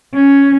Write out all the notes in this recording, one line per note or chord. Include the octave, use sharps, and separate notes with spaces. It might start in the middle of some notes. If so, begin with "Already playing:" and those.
C#4